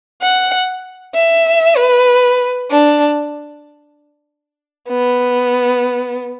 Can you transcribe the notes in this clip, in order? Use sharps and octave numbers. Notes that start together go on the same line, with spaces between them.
F#5
E5
B4
D4
B3